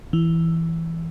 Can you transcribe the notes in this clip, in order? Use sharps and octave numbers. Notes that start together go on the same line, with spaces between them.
E3